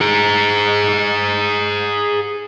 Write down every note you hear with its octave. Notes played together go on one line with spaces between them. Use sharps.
G#4 A#5